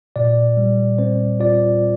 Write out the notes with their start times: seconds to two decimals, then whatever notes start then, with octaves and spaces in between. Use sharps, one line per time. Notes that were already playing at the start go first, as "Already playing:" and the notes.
0.16 A#2 D5
0.57 G3
0.98 C4 C5
1.40 F4 D5